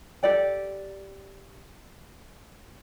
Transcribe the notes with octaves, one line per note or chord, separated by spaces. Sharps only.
G4 A4 D5 G5